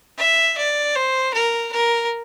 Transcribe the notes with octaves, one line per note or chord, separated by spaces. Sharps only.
E5
D5
C5
A#4
A#4